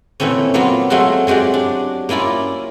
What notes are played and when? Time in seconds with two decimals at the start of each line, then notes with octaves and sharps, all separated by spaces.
0.20 A#2 E3 A3 C4 C#4
0.54 F#3 A#3 B3 F4
0.90 F#3 G#3 A3 C4 F4 F#4
1.27 F#3 G#3 F#4 G4 D5
1.54 D4
2.09 A#3 C#4 E4 F4 D5